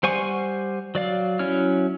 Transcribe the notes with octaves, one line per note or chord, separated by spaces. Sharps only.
G3 C5 F#5 G#5 C#6
F#3 D5 F5
F#3 C#4 E4 C#5 F6